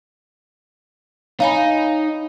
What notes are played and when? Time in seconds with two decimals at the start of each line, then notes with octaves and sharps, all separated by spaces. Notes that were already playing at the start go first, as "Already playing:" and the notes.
1.40 D#4 C#5 F5 G#5 B5